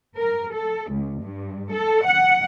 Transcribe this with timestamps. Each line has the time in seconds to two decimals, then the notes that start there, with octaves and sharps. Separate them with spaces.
0.16 A#4
0.53 A4
0.91 C#2
1.21 G2
1.71 A4
2.05 F#5